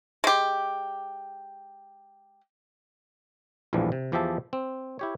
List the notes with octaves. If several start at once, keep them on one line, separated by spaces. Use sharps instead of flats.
G#3 G4
A#1 E2 A2 E3 F3 G3
C3
E2 F3 G4 G#4 E5 A5
C4
E4 G4 C#5